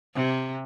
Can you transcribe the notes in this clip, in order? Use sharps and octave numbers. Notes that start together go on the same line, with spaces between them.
C3